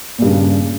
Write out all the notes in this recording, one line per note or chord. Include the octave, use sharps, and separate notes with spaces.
G2 A#2 C#3